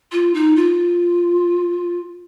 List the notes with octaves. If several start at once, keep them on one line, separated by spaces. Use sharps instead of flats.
F4
D#4
F4